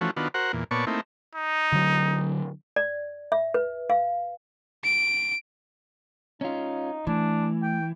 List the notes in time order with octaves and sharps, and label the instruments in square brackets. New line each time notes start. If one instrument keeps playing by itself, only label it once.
[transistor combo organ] E3 F3 A3 C#4 F#4
D#3 B3 D4 F4 F#4
F#4 A#4 C5 F#5
E2 A#2
A#2 B3 C#5 D5 A5 C#6
A3 A#3 C4 D#4 E4
[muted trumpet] D#4
[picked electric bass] D3 F#3
[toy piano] D5
E5
B4
F5
[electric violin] D7
[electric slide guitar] C#4 F4 [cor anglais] D#4
[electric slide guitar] E3 [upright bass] A3 [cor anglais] D4
[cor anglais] G5